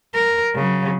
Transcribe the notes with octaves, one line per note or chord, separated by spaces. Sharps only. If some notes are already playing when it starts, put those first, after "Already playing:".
A#4
C#3 F#3